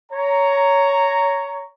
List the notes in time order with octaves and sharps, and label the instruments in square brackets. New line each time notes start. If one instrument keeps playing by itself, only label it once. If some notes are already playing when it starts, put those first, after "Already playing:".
[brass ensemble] C#5 A#5